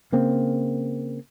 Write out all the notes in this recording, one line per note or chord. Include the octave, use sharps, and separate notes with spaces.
C#3 A#3 C4